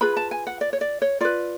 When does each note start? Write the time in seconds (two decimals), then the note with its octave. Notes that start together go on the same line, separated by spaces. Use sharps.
0.01 F4 G#4 B4 B5
0.17 A5
0.31 G#5
0.47 F#5
0.61 D5
0.73 C#5
0.81 D5
1.02 C#5
1.21 F4 B4 D5